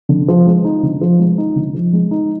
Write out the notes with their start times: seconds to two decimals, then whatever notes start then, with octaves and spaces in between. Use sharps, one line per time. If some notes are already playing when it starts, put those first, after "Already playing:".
0.09 D3
0.28 F3
0.47 G#3
0.64 D#4
0.83 D3
1.01 F3
1.19 G#3
1.38 D#4
1.56 D3
1.75 F3
1.93 G#3
2.11 D#4